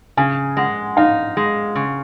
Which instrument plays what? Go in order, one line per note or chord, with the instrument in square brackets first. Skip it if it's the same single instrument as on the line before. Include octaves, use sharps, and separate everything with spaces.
[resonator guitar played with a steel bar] C#3 [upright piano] G#5
[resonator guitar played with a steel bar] G#3 [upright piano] F#5
[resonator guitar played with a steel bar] D#4 [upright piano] F5
[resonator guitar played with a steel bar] G#3
C#3